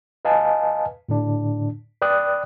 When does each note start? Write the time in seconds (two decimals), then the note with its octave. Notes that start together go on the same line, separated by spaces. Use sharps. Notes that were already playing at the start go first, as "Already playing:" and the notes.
0.25 B4 D#5 F5 G#5 A5
1.09 A2 D3 D4
2.02 B4 D5 G5 D#6 F#6